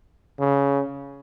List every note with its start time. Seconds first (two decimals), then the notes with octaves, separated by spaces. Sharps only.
0.40 C#3